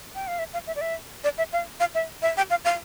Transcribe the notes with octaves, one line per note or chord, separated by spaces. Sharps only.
G5
F5
E5
F5
E5
D5
E5
D5
E5
F5
F5
E5
E5
G5
F5
F5